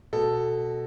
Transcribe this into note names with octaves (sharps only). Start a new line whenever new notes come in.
B2 A4